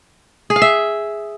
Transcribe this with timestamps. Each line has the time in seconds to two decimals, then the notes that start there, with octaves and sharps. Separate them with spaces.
0.50 G#4
0.56 F5
0.62 E5